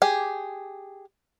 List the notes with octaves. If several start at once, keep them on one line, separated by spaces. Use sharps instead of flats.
G4 G#4